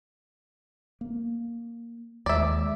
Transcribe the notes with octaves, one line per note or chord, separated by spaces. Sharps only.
A#3
D#2 G#3 D5 E5